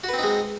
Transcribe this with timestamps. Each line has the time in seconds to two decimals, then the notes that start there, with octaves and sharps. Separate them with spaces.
0.04 F#4
0.09 B4
0.14 C4
0.18 D#4
0.23 G#3